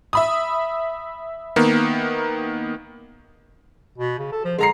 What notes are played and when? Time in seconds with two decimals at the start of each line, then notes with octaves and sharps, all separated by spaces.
0.13 E5 B5 D#6
1.56 D#3 A#3 B3
3.98 B2
4.19 C#3
4.32 A4
4.45 F3
4.59 D3 G#3 A#5 C7